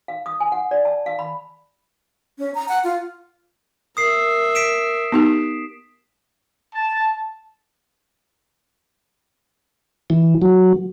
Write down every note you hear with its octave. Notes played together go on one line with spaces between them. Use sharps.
F5
D#6
G#5
F#5
D5
A5
F5
B5
C#4
A#5
F#5
F4
A#4 E5 D#6 C7
B6 D7 E7
B3 D#4 G4
A5
E3
F#3